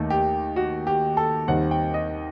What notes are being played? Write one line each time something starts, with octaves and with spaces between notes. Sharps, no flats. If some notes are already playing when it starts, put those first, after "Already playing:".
Already playing: D#2 D#3 A3
G4
F#4
G4
A4
D#2 D#3 G3 C4 F#5
G5
D#5